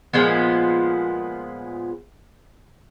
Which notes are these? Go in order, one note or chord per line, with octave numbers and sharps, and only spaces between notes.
A#2 F3 G#3 B3